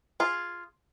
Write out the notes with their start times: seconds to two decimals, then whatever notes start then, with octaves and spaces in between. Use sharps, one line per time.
0.20 F4 G#4